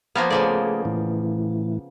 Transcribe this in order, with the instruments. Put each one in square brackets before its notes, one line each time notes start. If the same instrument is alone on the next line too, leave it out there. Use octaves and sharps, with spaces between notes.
[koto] F3 A#3 B3 [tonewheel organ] G#5 F6
[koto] C#3 F3 D5 [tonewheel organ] A3 G#4
[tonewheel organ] A2 E3